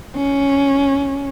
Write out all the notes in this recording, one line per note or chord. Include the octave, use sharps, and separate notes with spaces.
C#4